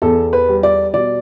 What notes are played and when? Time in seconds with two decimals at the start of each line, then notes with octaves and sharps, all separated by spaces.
0.02 E2 A4
0.33 B4
0.49 G3
0.63 D5
0.94 B2 D5